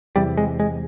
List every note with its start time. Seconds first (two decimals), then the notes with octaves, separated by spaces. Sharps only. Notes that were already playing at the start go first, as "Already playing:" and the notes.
0.16 E2 C3 G3
0.37 G#3
0.60 G#3